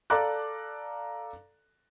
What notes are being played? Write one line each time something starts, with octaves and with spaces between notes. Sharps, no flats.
A4 D5 F5 A#5 D6 F#6